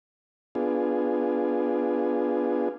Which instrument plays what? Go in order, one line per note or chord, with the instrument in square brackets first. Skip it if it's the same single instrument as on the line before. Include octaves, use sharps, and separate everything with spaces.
[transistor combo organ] B3 D4 F4 G#4